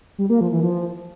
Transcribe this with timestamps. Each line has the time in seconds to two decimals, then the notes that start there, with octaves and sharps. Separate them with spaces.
0.18 G3
0.30 A#3
0.41 F3
0.52 E3
0.63 F3